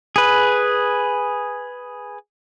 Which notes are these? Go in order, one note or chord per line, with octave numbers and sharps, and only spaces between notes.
G#4 B4